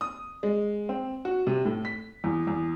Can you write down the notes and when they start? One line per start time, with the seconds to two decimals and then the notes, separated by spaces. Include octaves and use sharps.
0.01 D#6
0.43 G#3
0.89 C4
1.25 F#4
1.47 C3
1.65 A2
1.85 B6
2.24 E2
2.47 E2